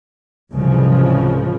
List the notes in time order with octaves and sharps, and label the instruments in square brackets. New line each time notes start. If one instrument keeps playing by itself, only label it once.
[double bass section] C2 G#2 C#3 E3 F3